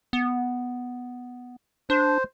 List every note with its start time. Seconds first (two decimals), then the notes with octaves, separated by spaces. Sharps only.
0.13 B3
1.90 D4 C5